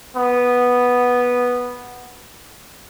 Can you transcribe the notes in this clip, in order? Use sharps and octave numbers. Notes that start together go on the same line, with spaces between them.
B3